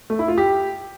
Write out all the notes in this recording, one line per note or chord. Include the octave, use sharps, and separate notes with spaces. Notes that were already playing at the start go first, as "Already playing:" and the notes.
A3
E4
F4
G4